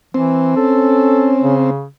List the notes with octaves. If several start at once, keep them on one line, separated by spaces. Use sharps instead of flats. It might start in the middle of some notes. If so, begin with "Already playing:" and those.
E3 C4
C#4 A4
C#3